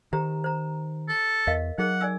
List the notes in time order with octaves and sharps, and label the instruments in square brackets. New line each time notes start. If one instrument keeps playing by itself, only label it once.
[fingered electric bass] D#3 [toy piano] G4 C5 A#5
[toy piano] C5 A#5
[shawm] A4
[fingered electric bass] E2 [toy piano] A#4 D#5 F5
[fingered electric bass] F#3 [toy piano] D#4 G#4 A#4 [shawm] F#5
[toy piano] D5 G#5 E6